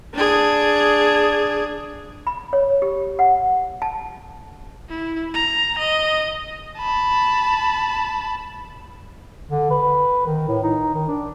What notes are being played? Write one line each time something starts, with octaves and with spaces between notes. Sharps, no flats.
D4 G#4
B5
C#5
G4
F#5
A5
E4
A#5
D#5
A5 B5
D3
B4
D#3
A2
D#4
D#3
D4